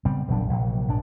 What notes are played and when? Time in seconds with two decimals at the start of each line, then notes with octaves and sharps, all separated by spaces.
0.05 C#3 G3 B3 C4
0.28 E1 A#1 F#3 D4
0.49 A#1 C3 F#3
0.87 A#1 G#2 D4